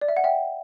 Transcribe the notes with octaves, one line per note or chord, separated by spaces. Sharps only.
D5
E5
F#5
E5 G5